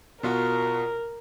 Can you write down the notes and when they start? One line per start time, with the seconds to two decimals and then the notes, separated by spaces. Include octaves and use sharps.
0.23 B2 F4 F#4 A#4